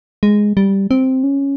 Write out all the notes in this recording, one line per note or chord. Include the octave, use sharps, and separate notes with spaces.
G#3
G3
C4
C#4